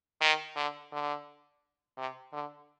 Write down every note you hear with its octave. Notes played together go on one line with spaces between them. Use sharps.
D#3
D3
D3
C3
D3